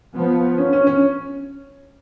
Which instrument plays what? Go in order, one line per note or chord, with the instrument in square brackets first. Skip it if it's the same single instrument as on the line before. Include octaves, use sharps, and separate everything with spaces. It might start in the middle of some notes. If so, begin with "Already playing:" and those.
[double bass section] F3 B3
[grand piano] C#4
C#4
C#4